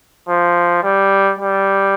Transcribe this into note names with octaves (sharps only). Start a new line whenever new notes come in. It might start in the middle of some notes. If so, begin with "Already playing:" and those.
F3
G3
G3